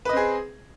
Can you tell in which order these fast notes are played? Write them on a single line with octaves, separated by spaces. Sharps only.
B4 D#5 C4 G#4